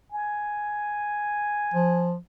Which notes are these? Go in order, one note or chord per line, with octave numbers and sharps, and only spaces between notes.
G#5
F3